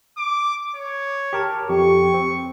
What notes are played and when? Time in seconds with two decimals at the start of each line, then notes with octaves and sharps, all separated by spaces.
0.17 D6
0.76 C#5
1.33 G4 A#4 A5
1.69 F2 G4 C#6
2.14 C4